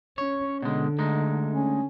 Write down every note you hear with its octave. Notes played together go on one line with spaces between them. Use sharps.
C#4 C#5
B2 D3 G#3
D2 G#3 D#4
C#4